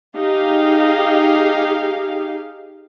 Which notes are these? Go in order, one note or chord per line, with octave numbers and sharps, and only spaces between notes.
D#4 G4 G#4 F5